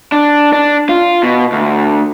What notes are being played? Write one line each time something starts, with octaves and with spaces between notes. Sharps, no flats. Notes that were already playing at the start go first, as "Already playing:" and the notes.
D4
D4
F4
B2
D2